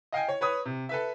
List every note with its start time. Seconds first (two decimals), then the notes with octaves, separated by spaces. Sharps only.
0.12 D#5 F5 G5 G#5
0.28 C#5
0.41 B4 C#5 B5 D#6
0.65 C3
0.89 A4 B4 E5